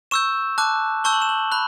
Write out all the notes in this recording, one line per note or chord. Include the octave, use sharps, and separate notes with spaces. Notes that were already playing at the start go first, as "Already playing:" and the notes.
C#6 E6 G6 E7
A5 D6 F#6
A5 C#6 E6 G6 G7
F#7
E7
F#7
B5 F#6